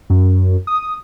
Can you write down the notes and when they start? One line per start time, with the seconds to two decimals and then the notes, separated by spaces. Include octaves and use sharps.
0.10 F#2
0.67 D#6